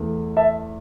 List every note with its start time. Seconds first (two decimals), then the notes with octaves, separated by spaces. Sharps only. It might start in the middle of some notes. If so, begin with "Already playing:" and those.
Already playing: E2 E3 A3
0.37 E5 A5